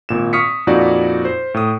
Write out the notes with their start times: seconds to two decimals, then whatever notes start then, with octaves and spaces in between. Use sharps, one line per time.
0.09 G#1 A#2 E7
0.33 C#6 D#6 F6 B6 C#7
0.67 F2 A#2 D#4 F#4 D5
1.25 C5
1.54 A2 D#6